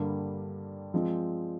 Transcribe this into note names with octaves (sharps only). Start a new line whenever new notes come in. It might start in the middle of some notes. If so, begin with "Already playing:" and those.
Already playing: G2 D3 G3 A#3
F3 G#3 C4